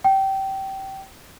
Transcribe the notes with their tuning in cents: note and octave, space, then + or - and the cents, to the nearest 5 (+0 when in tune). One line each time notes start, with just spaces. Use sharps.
G5 -20